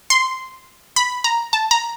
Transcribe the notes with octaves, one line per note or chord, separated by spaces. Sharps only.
C6
B5
A#5
A5
A#5